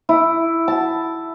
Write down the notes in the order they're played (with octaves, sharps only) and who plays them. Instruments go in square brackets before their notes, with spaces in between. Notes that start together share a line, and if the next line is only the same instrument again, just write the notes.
[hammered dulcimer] E4
A5